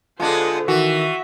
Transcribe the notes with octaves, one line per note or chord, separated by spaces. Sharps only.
D3 G#3 B3 D4 F4 C5 A5
D#3 E3 F#4 E5